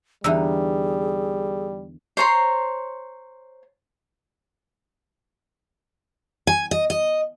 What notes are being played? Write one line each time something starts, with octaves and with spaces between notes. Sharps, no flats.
E2 D3 G3 D#4 G#4 E5 E6
C5 C#5 A#5 C6
G#5
D#5
D#5